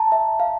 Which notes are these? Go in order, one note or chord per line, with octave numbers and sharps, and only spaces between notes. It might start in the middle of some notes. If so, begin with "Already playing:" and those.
Already playing: A5 A#5
E5
F5